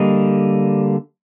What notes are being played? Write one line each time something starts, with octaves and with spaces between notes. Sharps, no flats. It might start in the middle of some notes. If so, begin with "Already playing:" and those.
Already playing: D3 G3 A#3 D#5